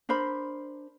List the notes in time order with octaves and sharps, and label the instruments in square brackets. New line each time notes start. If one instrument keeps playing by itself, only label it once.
[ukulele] D4 A#4 C5 B5